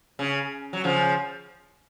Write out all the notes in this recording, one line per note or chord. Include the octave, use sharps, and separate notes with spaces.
C#3
F#3
C#3 F3